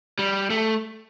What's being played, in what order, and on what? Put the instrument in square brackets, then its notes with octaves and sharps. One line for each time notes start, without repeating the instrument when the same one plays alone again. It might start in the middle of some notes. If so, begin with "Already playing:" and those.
[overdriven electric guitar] G3
A3